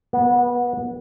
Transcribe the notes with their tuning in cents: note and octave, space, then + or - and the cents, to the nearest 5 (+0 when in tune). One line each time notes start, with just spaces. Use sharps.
B3 -25